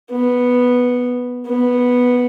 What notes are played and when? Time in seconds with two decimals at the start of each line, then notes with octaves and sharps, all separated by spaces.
0.10 B3
1.47 B3